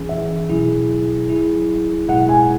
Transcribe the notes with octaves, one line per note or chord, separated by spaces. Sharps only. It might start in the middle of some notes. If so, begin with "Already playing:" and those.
Already playing: E3 C#4 G#4
E5
B2 F#3 E4 G#4
F#3 E4 G#4
B2 G#3 E4 G#4 F#5
G#5